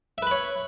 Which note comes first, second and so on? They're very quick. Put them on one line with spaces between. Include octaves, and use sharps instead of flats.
E5 B4 B5 C#5